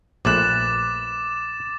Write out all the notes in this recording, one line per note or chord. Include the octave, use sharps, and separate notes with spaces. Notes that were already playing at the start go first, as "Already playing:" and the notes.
A#1 A#2 A3 B4 D6 F#6 A6 E7